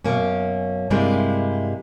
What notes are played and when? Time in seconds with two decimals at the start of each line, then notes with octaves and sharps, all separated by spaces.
0.04 F#2 B2 A#3 C#4
0.90 G2 C3 G3 G#3 A#3 E4